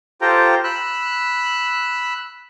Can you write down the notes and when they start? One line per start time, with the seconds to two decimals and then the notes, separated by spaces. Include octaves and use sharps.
0.21 F4 G4 A4 C5 G5 A#5
0.64 B5 E6 F#6